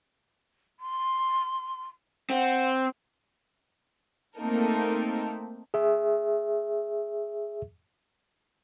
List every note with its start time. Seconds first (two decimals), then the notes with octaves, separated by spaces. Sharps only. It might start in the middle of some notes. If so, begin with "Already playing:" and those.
0.79 C6
2.30 C4 F#5
4.38 A3 A#3 C4 D#4 A4 A#4
5.74 G#4 E5